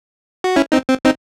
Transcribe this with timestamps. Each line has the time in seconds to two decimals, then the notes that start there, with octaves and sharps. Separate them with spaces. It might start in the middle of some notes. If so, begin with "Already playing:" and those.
0.44 F#4
0.56 C#4 E4
0.72 C4 D#4
0.89 C4
1.05 C4 D#4